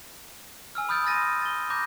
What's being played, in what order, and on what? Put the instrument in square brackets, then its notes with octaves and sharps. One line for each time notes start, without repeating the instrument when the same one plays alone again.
[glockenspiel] G#5 E6 F6
B5 D#6 F6 G6 A6 D7
C6 F6 A6 A#6 D#7
A6 G7
A#5 B5 D6 G6 A#6